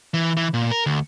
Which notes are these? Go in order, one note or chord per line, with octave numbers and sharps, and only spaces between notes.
E3
E3
A#2
A#4
D2